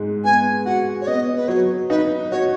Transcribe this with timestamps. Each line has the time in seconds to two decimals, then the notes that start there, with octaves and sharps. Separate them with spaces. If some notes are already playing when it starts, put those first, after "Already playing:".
Already playing: G#2 G#3
0.24 B3 G#5
0.65 F#4 F#5
1.01 C#5
1.07 B3 D#5
1.35 B4
1.48 F#3 C#5
1.89 D#4 B4
2.31 F#4 C#5